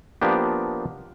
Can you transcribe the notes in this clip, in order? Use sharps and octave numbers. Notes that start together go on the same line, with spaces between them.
F3 A#3 B3 D4 G4